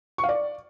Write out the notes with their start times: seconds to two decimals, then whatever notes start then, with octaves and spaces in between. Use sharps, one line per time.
0.18 C#6
0.24 F5
0.29 D5